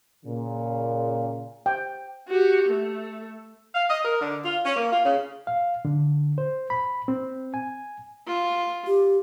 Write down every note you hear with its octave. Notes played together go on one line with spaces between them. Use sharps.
A#2 C#3
G5
F#4 G4
A3
F5
D#5
A#4
D3
F4
C#4
A#3
F4
C#3
F5
D3
C5
B5
C4
G#5
F4
G4